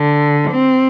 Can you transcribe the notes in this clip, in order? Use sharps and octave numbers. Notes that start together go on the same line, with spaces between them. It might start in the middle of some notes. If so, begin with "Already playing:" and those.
Already playing: D3
C4